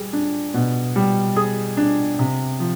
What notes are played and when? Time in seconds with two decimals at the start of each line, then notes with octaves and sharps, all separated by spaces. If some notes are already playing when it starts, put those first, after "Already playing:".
Already playing: G3 G#4
0.13 D4
0.54 B2
0.96 G3
1.37 G#4
1.77 D4
2.19 C3
2.60 F3